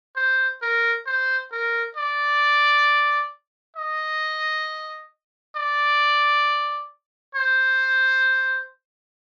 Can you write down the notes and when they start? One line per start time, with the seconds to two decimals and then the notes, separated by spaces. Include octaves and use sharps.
0.16 C5
0.62 A#4
1.07 C5
1.52 A#4
1.96 D5
3.77 D#5
5.56 D5
7.35 C5